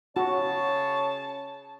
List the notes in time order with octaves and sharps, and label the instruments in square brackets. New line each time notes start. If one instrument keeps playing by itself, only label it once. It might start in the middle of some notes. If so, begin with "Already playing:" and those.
[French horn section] C#3 C#5 [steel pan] F#4 [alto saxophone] A5